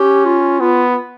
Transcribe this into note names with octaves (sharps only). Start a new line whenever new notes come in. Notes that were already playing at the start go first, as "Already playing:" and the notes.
Already playing: C#4 G4
F4
B3 F4